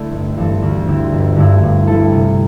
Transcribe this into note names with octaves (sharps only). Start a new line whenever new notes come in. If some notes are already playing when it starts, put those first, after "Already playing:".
Already playing: D3 A3 E4 A4
G1
G2 E3 C4 A4
D2
D3 C4 E4 G4
G1
G2 D3 A3 E4
G2
G3 E4 A4
C3